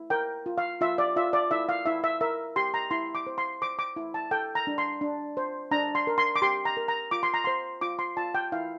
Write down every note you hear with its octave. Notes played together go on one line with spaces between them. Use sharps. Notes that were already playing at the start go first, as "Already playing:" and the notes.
Already playing: E4
A#4 G5
F4
F5
F4 E5
D5
F4 E5
D5
E4 E5
F5
E4 E5
E5
A#4 E5
G4 C6
A#5
E4 C6
D6
C5
C6
C5 D6
D6
E4
A5
A4 G5
A#5
D4
C6
D4
C5
D4 A#5
C6
A#4
C6
D6
G4 C6
A#5
A#4
A#5
F4 D6
C6
A#5
C5 C6
F4 D6
C6
F4 A5
G5
E4 F5